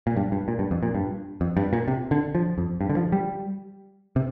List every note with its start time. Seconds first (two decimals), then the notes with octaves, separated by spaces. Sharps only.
0.07 A#2
0.17 G2
0.32 G2
0.48 A#2
0.59 G2
0.71 F2
0.83 A#2
0.95 G2
1.41 F2
1.57 G2
1.73 A#2
1.88 C3
2.11 D3
2.35 F3
2.58 F2
2.81 G2
2.90 D3
2.97 F3
3.12 G3
4.16 C3